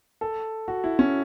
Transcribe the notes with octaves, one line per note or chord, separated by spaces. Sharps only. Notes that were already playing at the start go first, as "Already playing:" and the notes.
A4
F#4
E4
C#4